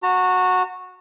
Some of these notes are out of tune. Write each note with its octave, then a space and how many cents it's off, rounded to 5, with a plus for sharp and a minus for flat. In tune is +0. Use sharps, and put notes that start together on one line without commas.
F#4 -10 A#5 -40